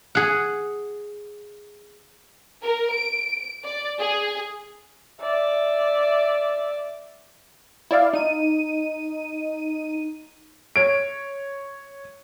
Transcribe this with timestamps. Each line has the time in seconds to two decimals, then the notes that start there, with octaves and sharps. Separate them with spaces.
0.15 G#4 F#5
2.64 A#4
2.93 D7
3.64 D5
4.00 G#4
5.20 D5 E5
7.91 E4 D5 F5
8.13 D#4 D#7
10.76 C#5 D7